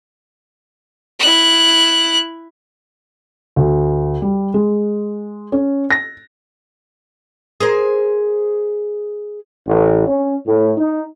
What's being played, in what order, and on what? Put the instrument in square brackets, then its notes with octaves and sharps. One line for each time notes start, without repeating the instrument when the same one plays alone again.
[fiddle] E4 F#6
[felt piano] D2
G3
G#3
C#4
A#6
[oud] G#4 A#4 C5
[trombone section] A1
C#4
A2
D#4